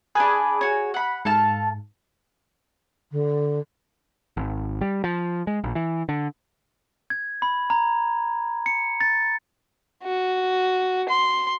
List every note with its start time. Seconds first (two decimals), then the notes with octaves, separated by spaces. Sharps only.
0.15 D4 G#4 B4 G#5
0.61 F#4 C#5
0.94 F#5 B5
1.25 G#2 A4 F5 A5
3.11 D3
4.37 G#1
4.81 G3
5.04 F3
5.47 G#3
5.64 A#1
5.75 E3
6.09 D3
7.10 G#6
7.42 B5
7.70 A#5
8.66 C#7
9.00 A6
10.04 F#4
11.09 C6